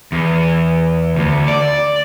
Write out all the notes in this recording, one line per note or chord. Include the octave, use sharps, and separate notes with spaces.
E2
D2
D5